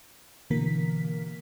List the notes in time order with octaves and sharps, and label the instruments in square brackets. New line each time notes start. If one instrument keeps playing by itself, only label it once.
[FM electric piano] B2 D3 E3 A#3 A#4 B6